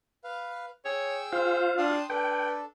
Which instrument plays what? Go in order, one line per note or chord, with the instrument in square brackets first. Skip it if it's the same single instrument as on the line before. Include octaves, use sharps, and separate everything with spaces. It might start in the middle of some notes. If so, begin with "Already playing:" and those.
[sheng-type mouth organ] B4 F5
[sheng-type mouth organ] G#4 G5 E6 [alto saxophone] C#5
[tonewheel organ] F4 F5 [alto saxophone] C5
[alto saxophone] D4 [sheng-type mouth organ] G5 C6 D#6
[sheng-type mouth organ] D4 A4 [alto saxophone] B4 [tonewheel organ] G5